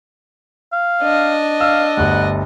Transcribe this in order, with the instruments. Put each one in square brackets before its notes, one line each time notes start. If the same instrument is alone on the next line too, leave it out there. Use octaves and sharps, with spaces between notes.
[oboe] F5
[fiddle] D4 D#5
[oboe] F5 [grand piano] E6
[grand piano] G1 D2 [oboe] F#5